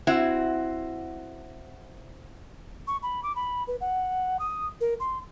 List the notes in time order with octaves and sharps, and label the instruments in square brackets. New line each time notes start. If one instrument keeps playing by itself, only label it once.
[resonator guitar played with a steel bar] C4 E4 F#4
[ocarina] C#6
B5
D6
B5
B4
F#5
D#6
A#4
C6